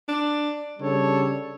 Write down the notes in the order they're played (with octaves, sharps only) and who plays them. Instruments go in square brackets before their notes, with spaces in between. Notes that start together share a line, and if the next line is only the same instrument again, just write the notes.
[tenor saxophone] D4
[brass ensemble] C#3 G3 D4 A4 C#5